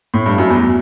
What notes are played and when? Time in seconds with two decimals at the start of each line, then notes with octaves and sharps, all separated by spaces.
0.14 A2
0.26 G2
0.38 F#2
0.50 E2